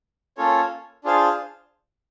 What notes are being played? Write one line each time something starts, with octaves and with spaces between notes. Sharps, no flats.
A#3 C#4 F4 A4 C#5
D4 F4 G#4 C5 F5